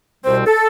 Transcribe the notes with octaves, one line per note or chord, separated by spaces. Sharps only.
C2 B2 G3 C4 C5
A4